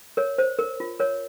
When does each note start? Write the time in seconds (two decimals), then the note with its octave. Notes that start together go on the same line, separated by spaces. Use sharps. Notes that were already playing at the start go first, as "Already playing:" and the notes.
0.17 A#4 C#5
0.38 C5
0.59 A#4
0.80 F4
1.00 A#4 C#5